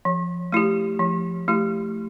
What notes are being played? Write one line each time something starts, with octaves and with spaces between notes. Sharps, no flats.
F3
A3 E4 G4
F3
A3 E4 G4